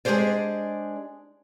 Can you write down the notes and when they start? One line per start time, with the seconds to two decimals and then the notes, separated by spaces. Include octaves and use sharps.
0.05 G#3 D4 G4 G#4 C5 D5